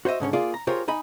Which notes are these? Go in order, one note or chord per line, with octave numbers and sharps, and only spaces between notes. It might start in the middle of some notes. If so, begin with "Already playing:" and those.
F#4 C5 C#5 D#5 E5
G#2 D3 C#4 C#5
A#3 F4 G#4 D5
A#5
F4 G4 G#4 A#4 C5 C#5
D#4 D#5 G#5 B5